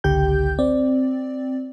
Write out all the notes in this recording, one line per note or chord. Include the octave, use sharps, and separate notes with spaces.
G#1 C#2 D3 G4 G5 G6
C4 D5